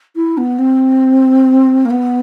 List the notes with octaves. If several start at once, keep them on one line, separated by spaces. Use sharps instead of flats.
E4
B3
C4
A#3
B3